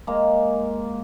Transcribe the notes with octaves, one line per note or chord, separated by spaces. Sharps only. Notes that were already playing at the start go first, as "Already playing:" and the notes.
G#3 A#3